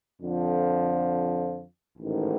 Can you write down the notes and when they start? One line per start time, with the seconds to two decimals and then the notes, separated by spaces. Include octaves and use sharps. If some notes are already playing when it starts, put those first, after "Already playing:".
0.21 F2 D3 F3
1.98 A1 G#2 D#3